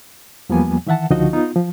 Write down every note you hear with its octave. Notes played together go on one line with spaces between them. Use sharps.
E2 F3 G3 A#3 B3 G#5
D#3 E3 E5 F#5 A5
C#2 D3 F3 D#4 F#4 D#5
B3 D#4 F4
F3